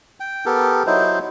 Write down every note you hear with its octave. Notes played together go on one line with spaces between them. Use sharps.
G5
B3 G4 A4 A#4
F#3 D#4 E4 C5